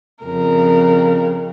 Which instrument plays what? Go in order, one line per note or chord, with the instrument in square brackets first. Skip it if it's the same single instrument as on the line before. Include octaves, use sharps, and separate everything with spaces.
[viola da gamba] F2 C#3 [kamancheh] A#4